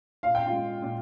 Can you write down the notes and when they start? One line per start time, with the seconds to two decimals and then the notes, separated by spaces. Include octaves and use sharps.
0.23 A#2 F5
0.35 G5
0.46 F4 F5
0.52 G#3
0.82 A#2